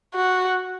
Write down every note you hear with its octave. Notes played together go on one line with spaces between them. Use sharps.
F#4